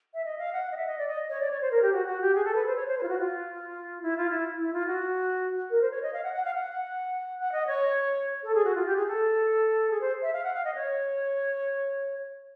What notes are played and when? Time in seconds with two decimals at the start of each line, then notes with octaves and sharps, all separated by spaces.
0.14 E5
0.25 D#5
0.38 F5
0.53 F#5
0.72 D#5
0.77 E5
0.87 D#5
0.98 D5
1.08 D#5
1.30 C#5
1.40 D5
1.51 C#5
1.61 C5
1.71 A#4
1.82 G4
1.93 F#4
2.06 F#4
2.21 G4
2.35 G#4
2.45 A4
2.55 B4
2.66 C5
2.76 C#5
2.87 C5
2.98 B4
3.03 F4
3.08 F#4
3.19 F4
4.02 E4
4.17 F4
4.30 E4
4.59 E4
4.73 F4
4.87 F#4
5.70 A#4
5.82 C5
5.91 C#5
6.02 D#5
6.13 F5
6.24 F#5
6.34 F#5
6.45 F5
6.54 F#5
7.39 F#5
7.52 D#5
7.67 C#5
8.43 A4
8.55 G#4
8.65 F#4
8.75 F4
8.86 G4
8.96 G#4
9.07 A4
9.91 G#4
10.01 C5
10.22 E5
10.33 F5
10.44 F#5
10.54 F5
10.65 D#5
10.75 C#5